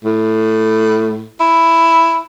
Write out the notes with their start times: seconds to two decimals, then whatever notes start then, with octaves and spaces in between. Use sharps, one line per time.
0.04 A2
1.40 E4